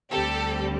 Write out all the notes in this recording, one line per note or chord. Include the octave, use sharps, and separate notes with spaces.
D2 D3 G3 C4 G4 A4